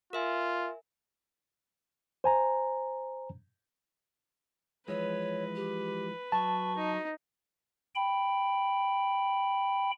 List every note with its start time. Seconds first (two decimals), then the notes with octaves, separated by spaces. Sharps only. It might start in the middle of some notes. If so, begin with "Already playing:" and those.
0.13 F4 A#4 E5 G#5
2.24 C5 G#5 A#5
4.88 E3 F3 G#3 B4 C#5
5.56 G4
6.32 F#3 A5 C#6
6.76 D#4
7.95 G5 B5